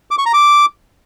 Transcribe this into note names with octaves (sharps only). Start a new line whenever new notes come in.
D6
C#6
A#5
D6